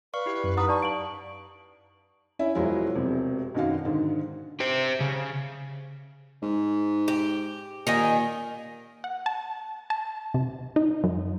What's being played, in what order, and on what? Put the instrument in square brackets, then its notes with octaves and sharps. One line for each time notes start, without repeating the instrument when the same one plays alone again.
[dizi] B4 [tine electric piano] D5 [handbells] F5 C#6 F6
[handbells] E4 G4
[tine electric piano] F#2
[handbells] D#4 [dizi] B4 [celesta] F#5 A#5 D#6
[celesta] D5 A5 [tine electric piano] A#5 [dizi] C#6
[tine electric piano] F5 [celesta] D7 F#7
[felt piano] C#4 E4 E5
E1 F3 F#3 G#3 E4
E1 C3
B1 F#2 D#3 F#4 F5
G#2 D3 D#3
[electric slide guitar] G4 C5
C#3
[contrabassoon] G#2
[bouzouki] G4
[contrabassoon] A#2 [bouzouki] D#3 D#5 G#5
[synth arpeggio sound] F#5
A5
A5
C3
D#4
F#2